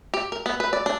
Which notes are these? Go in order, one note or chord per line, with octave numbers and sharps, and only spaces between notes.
G4
A#4
B3
B4
D5
D4